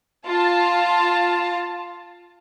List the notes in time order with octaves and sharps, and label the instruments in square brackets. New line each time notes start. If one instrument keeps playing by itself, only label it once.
[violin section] F4 A5